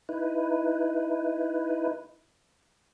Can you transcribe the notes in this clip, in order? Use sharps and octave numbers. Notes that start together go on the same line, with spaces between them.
D#4 E4 B4